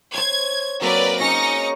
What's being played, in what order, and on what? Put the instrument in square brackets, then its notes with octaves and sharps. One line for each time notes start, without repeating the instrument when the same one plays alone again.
[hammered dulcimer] C5 C#5 [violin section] G#6
[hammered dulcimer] F#3 A#3 C4 [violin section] A#4 B4 D5
[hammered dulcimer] C#4 G#4 C#5 [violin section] D#4 A#6 C#7